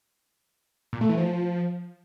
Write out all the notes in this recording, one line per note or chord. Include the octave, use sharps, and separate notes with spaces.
A#2
A3
E3
F3